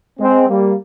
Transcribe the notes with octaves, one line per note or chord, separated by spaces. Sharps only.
G#3 C4
G3 A#3